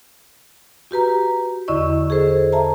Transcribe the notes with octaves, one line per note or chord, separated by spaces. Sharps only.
F#4 G4 B4 A#5
E2 D3 E4 D5 D#5 C#6
G#4 A4 C5
A4 E5 A5 A#5